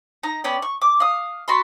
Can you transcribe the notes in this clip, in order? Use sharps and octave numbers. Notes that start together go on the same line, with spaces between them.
D#4 A#5
B3 C#4 D5 G5
C#6
D6
F5 D#6
F#4 A5 B5 C6